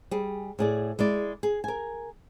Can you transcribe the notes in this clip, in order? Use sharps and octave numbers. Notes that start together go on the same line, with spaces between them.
G3 G#4
A2 G#4 D5
G#3 E4 D5
G#4
A#4 G#5